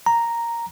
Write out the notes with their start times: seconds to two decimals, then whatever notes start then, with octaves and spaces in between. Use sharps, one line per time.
0.06 A#5